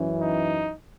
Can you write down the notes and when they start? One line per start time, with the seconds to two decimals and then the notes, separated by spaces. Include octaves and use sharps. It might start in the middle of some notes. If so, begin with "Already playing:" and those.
Already playing: F#2 E3 C#4
0.21 D#4